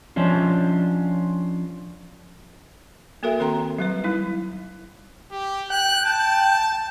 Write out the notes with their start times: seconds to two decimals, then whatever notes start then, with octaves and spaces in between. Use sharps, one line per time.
0.16 F3 C#4 D4 F4
3.23 A#3 F#4 A4 A#4 E5
3.39 D#3 C4 A4 G5 A#5 C6
3.78 F#3 G3 B4
4.04 G3 D#4 E4
5.31 G4
5.70 G5 F#6
6.05 A5